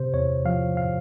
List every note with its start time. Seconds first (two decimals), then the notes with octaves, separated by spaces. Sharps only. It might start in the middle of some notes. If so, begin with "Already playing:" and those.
Already playing: C3 C5
0.13 E2 C#5
0.45 F3 F5
0.77 F5